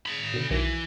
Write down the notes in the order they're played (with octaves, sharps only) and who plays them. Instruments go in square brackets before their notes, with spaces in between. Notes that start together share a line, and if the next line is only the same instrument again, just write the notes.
[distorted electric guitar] G#4 B5
[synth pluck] B2 D3
[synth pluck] B1 D#3 F#4 [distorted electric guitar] E3